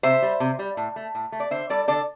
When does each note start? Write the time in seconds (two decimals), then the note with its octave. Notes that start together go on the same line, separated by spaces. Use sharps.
0.03 C3 C5 E5
0.22 G3
0.40 C3
0.59 G3
0.77 A2
0.96 A3
1.15 A2
1.32 A3
1.40 D5
1.51 D3 C5 E5
1.70 G3 A4 D5
1.88 D3 A4 D5